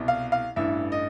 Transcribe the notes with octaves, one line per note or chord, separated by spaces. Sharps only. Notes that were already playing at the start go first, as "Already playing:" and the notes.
Already playing: C2 B2
F5
F5
A1 G2 E3 E5
D#5